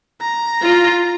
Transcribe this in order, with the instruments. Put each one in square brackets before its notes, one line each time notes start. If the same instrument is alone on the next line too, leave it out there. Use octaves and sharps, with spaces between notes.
[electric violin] A#5
[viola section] F4